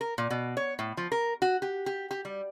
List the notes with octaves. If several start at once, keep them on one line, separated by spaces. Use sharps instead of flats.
A#4
A#2
B2
C#5
A2
F3
A#4
F#4
G4
G4
G4
G3